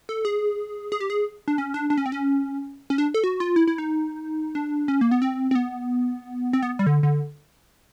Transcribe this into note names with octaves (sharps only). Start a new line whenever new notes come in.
A4
G#4
G#4
G4
G#4
D4
C#4
D4
D4
C#4
C4
C#4
C#4
D4
A4
F#4
F4
E4
E4
D#4
D4
C#4
A#3
B3
C4
C4
B3
C4
B3
G3
D3
D3